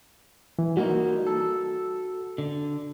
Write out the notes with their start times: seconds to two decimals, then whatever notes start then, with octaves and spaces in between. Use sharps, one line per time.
0.59 E3
0.77 G3 A#3 D#4 F#4
1.27 A4
2.38 D3